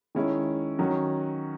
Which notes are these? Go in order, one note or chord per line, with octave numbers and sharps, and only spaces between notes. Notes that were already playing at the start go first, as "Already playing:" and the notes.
D#3 G#3 C#4 E4
D#3 F#3 C#4 F#4